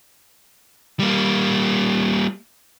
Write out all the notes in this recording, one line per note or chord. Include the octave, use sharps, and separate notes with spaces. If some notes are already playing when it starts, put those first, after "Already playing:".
G3 A#3